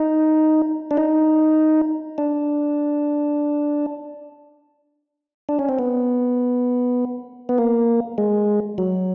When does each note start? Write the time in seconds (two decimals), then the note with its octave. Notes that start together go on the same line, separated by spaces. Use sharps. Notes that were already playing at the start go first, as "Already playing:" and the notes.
Already playing: D#4
0.91 D4
0.97 D#4
2.18 D4
5.49 D4
5.59 C#4
5.69 C4
5.79 B3
7.49 B3
7.58 A#3
8.18 G#3
8.78 F#3